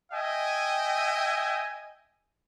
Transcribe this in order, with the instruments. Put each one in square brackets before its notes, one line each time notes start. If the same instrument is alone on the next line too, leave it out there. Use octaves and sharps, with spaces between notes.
[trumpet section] D#5 E5 G5 G#5